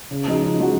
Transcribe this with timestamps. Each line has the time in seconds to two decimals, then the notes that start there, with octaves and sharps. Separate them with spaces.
0.11 C#3
0.27 F3 G#3 D#4 F#4
0.42 C#3
0.59 F3 G#3 D#4 F#4